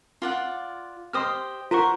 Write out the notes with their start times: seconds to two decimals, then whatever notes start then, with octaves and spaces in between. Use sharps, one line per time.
0.22 F4 D5 F#5
1.13 G4 C5 D#5 C6 D#6 F6
1.71 F4 A#4 C5 F#5 C#6